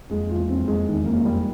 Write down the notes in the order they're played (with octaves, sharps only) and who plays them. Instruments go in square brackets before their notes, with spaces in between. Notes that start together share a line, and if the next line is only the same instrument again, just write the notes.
[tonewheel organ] F2 [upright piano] G#3
[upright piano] F4
[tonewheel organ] E2
[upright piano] C4
[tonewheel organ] F2
[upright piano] G#3
[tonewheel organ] E2 [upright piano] D#3
[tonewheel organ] F2 [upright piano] A#3
[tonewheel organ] F#2
[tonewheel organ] F2 [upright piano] G3